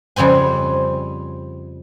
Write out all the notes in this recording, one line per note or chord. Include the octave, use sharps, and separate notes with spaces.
F2 C#3 G3 C4 G#5